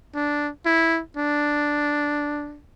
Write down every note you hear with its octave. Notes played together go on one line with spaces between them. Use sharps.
D4
E4
D4